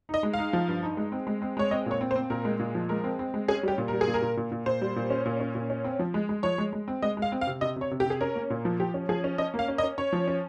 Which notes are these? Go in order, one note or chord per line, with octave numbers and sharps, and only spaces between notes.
D#4 D#5
G#3
D#4 F5
F3
G2
D#4
G#3
C4
G#3
C4
G#3 C#5
C4 D#5
A#2 C#5
C4
C5
C4
A#2 A#4
G#3
A#2
F3
G#3 A#4
C4
C4
G#3
C#4 G#4
G3 G4
A#2
G3 A#4
G#4
A#2
A#4
A#2
A#2
A#2
A#2 C5
G3
A#2
C#4
A#2
C#4
A#2
C#4
C4
F3
G#3
G#3
F3 C#5
G#3
G#3
C4
G#3 D#5
G#3
F5
C4
F5
C3
C3 D#5
C3 C#5
C3
G4
C3 G#4
C#4 A#4
A#3
A#2
F3
F3 G4
C#4
F3 G#4
C#4
C#4 D#5
A#3
F5
C#4
D#5
C#4
C#4 C#5
F3
C#4